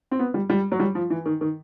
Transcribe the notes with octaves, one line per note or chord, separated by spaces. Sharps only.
C4
B3
G3
G3
F#3
G3
F3
E3
D#3
D#3